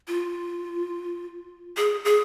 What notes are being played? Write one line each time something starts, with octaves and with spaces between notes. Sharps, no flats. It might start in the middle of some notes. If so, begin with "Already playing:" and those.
F4
G#4
G#4